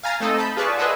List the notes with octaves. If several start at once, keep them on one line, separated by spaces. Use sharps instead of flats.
F5 G#5 A#5 A6 C7
A3 C4 D#4 A4 D#5
A5 B5 G6
F4 G#4 B4 D5 A5 C#6
G#4 B4 C5 D#5 E5 F#5